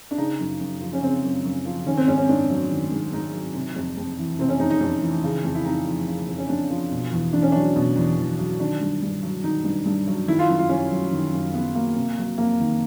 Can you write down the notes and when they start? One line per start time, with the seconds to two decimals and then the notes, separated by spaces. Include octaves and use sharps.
0.11 D4
0.18 C#3 D#4
0.39 F#2
0.60 F#2
0.81 F3
0.93 C#4
1.02 C#3 C4
1.24 F#2
1.44 F#2
1.65 F3
1.86 D#3 C#4
1.97 C4
2.07 G#2 C#4
2.18 C#4
2.29 G#2 D4
2.50 F#3
2.71 D#3
2.91 G#2
3.12 G#2 D#4
3.34 F#3
3.54 C3
3.76 F2
3.97 F2
4.18 E3
4.39 C3 C4
4.49 C#4
4.59 F2 D#4
4.70 D#4
4.81 F2
5.01 E3
5.24 C#3
5.44 F2
5.55 E4
5.65 F2 D#4
5.86 F3
6.07 C#3
6.28 F2
6.38 C#4
6.49 F2 D4
6.70 F3
6.91 B2
7.12 E2
7.33 E2 D4
7.42 C#4
7.52 F#3 D4
7.76 B2
7.96 E2
8.18 E2
8.39 F#3
8.60 D#3 D4
8.81 G2
9.02 G2
9.23 F#3
9.43 D#3 D#4
9.64 G2
9.86 G2
10.07 F#3
10.27 D#3 E4
10.39 F4
10.49 F#2
10.59 F4
10.69 F#2 C#4
10.91 F#3
11.12 D#3
11.33 F#2
11.54 F#2 B3
11.75 F#3 A#3
11.95 C3
12.18 F#3
12.38 F2 A#3
12.60 D#3